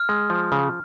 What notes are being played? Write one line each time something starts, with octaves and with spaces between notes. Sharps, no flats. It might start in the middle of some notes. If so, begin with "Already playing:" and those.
Already playing: F6
G#3
F3
C#3